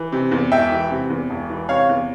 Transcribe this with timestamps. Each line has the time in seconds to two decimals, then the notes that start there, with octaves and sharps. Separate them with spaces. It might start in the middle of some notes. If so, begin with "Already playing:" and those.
Already playing: E3
0.12 C3
0.32 E2
0.52 E1 E5 G5
0.72 E3
0.91 C3
1.10 E2
1.30 E1
1.50 E3
1.69 C3 C#5 F5
1.89 E2